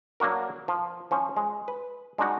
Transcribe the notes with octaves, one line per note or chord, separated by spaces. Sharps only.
F#3 A#3 D4 F#4 A#4
F3
F3 C#4 C5
G#3
B4
G#3 D4 D#4 F#4 F#5